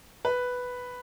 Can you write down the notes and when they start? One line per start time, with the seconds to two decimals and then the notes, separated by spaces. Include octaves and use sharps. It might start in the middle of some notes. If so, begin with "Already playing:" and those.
0.25 B4